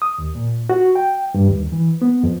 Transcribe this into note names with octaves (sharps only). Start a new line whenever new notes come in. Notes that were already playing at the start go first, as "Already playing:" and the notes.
D#6
D#2
A#2
F#4
G5
G2
D#2
E3
B3
F2